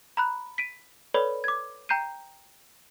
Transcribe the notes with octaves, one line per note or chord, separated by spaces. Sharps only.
A#5 B5 F#6
B6 D7 D#7
A4 B4 C#5 D5 B5
D6 G#6
G5 A#5 G6 C7 D#7